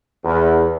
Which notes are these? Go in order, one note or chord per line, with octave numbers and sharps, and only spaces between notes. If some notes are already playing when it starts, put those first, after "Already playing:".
E2